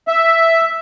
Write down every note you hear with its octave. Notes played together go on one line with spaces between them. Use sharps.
E5